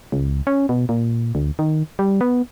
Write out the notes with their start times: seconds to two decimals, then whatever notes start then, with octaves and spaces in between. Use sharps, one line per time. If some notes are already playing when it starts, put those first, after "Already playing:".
0.12 C#2
0.47 C#4
0.69 B2
0.89 A#2
1.35 D2
1.59 D#3
1.99 G3
2.21 B3